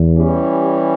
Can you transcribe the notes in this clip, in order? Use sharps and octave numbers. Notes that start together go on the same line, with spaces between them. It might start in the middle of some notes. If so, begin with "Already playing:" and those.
Already playing: E2
E3 G3 C#4 G4